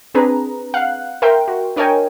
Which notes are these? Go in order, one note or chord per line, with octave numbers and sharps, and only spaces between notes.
C4 D4 G#4 B4 A#5
F5 F#5 F#6
A#4 E5 G5 C6
F#4
D4 A#4 C#5 D#5 G5 G#5